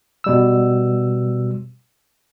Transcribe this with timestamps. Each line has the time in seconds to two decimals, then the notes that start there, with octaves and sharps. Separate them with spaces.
0.24 B2 G3 E6